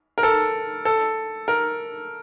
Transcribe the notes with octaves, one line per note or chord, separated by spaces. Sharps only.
A#4
A4
A4
A#4